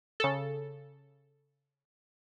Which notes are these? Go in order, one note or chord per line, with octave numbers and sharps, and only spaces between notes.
C#3 A4